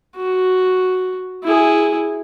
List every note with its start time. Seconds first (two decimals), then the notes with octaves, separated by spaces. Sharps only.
0.17 F#4
1.44 E4 G#4